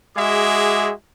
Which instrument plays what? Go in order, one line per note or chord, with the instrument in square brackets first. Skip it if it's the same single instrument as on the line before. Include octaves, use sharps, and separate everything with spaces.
[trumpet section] G#3 F#4 G#4 E5 D6